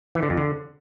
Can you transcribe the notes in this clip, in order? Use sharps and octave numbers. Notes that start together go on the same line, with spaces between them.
E3
D3
F2
D3